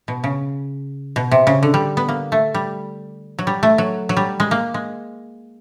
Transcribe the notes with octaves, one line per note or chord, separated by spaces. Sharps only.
B2
C#3
B2
C3
C#3
D3
G3
B3
A#3
A3
G3
F#3
G3
A3
F#3
F#3
G3
G#3
A#3
G#3